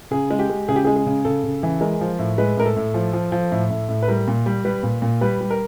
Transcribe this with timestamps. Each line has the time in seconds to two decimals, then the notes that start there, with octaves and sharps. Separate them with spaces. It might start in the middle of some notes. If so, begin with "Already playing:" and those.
0.11 C#3 G#4
0.31 G#3
0.39 G4
0.50 G#3
0.68 C#3 G#4
0.76 G4
0.85 G#3 G#4
0.96 G#4
1.06 C#3
1.25 C#3 A4
1.44 C#3
1.63 E3
1.81 G#3 A#4
2.01 F3
2.19 A2
2.38 G#3 B4
2.57 A2 A#4
2.66 A4
2.76 A2
2.94 F3
3.13 F3
3.32 F3
3.52 A2
3.71 A2
3.89 A2
4.02 B4
4.08 G3 A#4
4.28 A#2
4.46 G3
4.65 G3 B4
4.83 A#2
5.02 A#2
5.21 G3 B4
5.41 G3
5.51 A#4